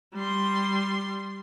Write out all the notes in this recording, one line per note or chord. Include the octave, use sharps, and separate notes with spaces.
G3 C6